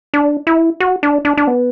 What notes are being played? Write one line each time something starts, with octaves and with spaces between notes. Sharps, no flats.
D4
E4
F#4
D4
D4
D4
B3